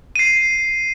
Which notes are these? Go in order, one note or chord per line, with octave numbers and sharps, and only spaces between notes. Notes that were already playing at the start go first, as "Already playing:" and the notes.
C7 D#7